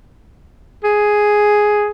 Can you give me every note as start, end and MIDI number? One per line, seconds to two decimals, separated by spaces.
0.84 1.91 68